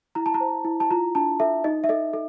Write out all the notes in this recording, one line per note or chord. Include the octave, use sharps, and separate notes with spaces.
E4 A#5
A5
A#5
C5
E4
A5
F4 A#5
D4 A5
A4 E5
D#4 D#5
E5
A4 D#5
A4